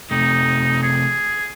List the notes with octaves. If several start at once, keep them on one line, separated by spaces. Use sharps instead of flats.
C3 A3 D#4
G#4